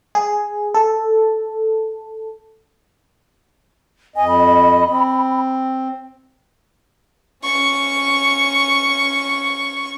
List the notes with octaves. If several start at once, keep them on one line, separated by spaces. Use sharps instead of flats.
G#4
A4
F2 D#5 G#5
B5
C4
C#4 C#6